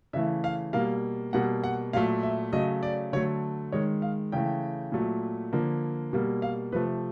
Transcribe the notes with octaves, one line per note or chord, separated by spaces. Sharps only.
C#3 E3 A3 E5
F5
B2 G3 A#3 F5
B2 G3 A#3 F#5
F#5
A#2 F#3 A3 F5
E5
C#3 F#3 A3 D#5
D5
D3 F#3 A3 C#5
D#3 G#3 C#5
F5
C#3 E3 A3 G5
A#2 F#3 A3
D3 F3 A#3
B2 G3 A#3
F5
C3 F3 A3 B4